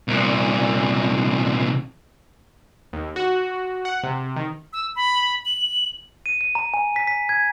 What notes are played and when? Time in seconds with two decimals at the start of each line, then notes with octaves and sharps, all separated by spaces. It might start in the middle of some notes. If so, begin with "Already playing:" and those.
0.08 C2 A#2
2.93 D#2
3.16 F#4
3.85 F#5
4.03 C3
4.36 D#3
4.73 E6
4.96 B5
5.45 F#7
6.26 D#7
6.41 D#7
6.55 A#5
6.74 G#5
6.96 B6
7.07 B6
7.29 G#6